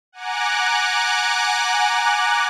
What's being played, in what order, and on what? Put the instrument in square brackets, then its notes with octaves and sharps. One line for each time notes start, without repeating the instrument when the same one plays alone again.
[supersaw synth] F#5 G#5 A#5 D6 F#6